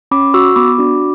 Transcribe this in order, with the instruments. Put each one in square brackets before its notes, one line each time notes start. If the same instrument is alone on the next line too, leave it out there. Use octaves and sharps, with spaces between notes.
[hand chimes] C#4 B5 D6
F#4 C#6 E6
B3 B5 D6
D4 F#4